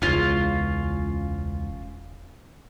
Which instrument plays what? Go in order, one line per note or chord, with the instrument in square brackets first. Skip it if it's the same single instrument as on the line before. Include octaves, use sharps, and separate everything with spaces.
[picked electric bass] E1 C#2 [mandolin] C#4 F4